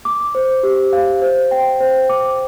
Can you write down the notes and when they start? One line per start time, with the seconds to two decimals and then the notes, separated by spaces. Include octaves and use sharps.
0.05 D6
0.35 C5
0.63 G4
0.93 F5
1.22 C5
1.51 G5
1.81 C5
2.10 D6